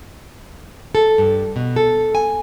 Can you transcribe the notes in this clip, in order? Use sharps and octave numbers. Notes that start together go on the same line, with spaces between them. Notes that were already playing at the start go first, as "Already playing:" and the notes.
A4
G2
B2
A4
G#5